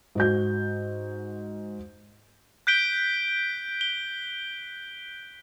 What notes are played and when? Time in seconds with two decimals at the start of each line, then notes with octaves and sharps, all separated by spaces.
0.15 G#2 F#4 G6
2.67 F#6 G6 B6 D7 G7
3.81 G7